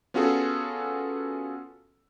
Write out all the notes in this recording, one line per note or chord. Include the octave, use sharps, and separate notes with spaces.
B3 C#4 F4 F#4 G#4 A4